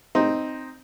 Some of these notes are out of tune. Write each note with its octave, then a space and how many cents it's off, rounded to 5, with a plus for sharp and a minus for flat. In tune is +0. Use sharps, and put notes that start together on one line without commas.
C4 +0 D#4 +0